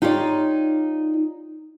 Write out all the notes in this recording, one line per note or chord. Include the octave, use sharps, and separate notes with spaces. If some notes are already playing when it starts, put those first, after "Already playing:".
D#4 F4 G4 C#5 D5